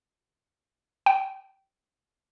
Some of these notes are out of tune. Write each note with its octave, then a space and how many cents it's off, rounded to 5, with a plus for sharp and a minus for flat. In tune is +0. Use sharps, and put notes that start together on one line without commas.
G5 -20